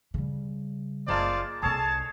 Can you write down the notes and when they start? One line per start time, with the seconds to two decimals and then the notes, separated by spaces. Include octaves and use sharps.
0.14 C#3 G3
1.08 F#1 G#3 A#3 F4 C5 D5 A5
1.62 C2 C4 G#4 A4 C#5 A5